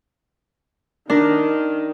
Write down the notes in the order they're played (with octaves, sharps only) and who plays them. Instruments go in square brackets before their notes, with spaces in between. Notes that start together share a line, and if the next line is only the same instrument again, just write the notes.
[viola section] D#3 [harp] D4 A#4